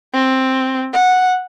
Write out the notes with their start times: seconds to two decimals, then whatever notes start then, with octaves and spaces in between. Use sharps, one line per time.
0.14 C4
0.93 F#5